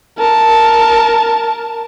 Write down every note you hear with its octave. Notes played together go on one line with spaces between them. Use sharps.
A#4 A5